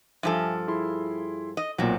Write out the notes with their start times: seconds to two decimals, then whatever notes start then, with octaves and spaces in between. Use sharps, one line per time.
0.23 G2 F3 A4 E5 G#5
0.68 E4 G#4 C6
1.57 D#5
1.78 B1 A#2 F#3 C4